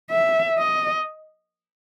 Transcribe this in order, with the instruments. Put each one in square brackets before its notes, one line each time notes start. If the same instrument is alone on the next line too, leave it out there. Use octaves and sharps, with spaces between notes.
[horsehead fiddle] E5
D#5